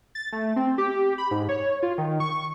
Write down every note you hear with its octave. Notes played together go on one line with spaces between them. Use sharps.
A6
A3
C4
G4
B5
G#2
C#5
F4
D#3
C#6